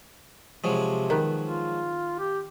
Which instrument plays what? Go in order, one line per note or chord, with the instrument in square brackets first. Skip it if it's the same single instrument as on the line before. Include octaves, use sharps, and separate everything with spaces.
[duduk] C3 [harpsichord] F3 F#3 G#3
[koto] D#3 B3
[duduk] F4
G4